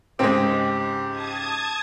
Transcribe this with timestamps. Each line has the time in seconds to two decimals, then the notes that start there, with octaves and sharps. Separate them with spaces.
0.19 C#2 G#2 C#3 G#3 C4 G4
1.11 A5 D#6 G#6